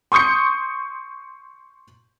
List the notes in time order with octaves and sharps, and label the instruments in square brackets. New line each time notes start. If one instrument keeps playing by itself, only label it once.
[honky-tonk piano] C6 C#6 D#6 G6 C#7